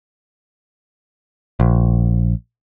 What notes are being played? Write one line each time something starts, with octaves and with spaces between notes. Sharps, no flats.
A#1